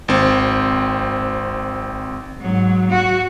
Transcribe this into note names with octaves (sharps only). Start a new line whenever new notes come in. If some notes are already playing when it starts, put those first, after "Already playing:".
G#1 C4
G#2 F#3
F#4